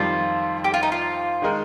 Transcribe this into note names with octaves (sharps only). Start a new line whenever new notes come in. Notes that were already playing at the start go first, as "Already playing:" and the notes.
Already playing: F2 D#3 G3 F4
G4
F4
D#4
F4
D#3 G#3 D#4 A#4